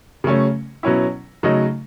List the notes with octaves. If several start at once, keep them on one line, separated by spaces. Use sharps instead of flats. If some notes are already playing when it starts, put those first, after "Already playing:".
C#3 F#3 A3 C#4
B2 F#3 C#4 E4
C#3 F#3 A3 D#4